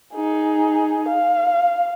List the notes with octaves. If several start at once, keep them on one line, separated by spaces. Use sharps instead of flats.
D#4 G#4
F5